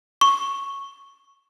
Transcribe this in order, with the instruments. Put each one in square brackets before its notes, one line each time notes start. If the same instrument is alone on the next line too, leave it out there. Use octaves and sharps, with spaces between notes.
[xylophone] C#6